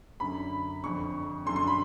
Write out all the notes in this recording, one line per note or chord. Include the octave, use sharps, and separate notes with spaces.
F#2 D3 B5
F2 D3 C#6
F#2 D3 C6
C6
B5